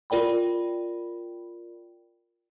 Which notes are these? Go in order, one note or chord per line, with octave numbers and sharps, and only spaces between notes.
F4 A#4 D5 G5 B5